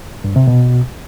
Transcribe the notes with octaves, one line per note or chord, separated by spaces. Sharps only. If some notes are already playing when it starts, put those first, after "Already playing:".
G2
C3
B2